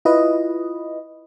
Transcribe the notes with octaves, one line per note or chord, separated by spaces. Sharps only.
E4 F4 B4 D#5